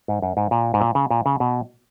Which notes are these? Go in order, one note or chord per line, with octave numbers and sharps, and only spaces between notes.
G#2
F#2
G#2
A#2
G#2
A#2
C#3
A#2
C#3
B2